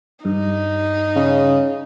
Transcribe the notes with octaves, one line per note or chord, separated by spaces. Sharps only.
G2 D#4
C#3